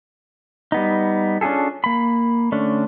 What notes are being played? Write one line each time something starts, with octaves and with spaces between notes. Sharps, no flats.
G3 B3 D#4
C#4 D4 F4 G#4 A4
A#3 B5
D3 A3 C#4 D4